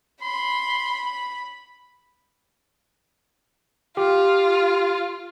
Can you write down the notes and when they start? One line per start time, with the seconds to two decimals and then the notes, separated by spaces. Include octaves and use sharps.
0.22 B5 C6
3.97 F4 G4